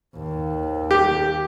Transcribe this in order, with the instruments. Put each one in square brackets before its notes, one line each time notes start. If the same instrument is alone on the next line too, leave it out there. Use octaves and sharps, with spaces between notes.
[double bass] D#2
[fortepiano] G4